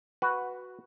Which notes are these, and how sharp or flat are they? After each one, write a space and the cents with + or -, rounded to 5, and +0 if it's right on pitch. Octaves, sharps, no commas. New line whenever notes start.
F#4 +0 B4 +0